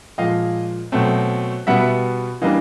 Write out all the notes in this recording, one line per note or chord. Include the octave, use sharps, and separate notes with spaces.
A#2 F3 G#3 D#5 F5
B2 F#3 A3 C4
B2 G3 B3 E5 F#5
E3 G3 A#3 D4 D#5 F5